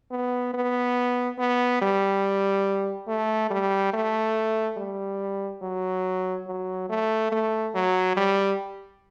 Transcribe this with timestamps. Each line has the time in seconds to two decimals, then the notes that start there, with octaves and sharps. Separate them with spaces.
0.11 B3
0.53 B3
1.39 B3
1.81 G3
3.08 A3
3.50 G3
3.93 A3
4.77 G3
5.62 F#3
6.47 F#3
6.89 A3
7.31 A3
7.74 F#3
8.17 G3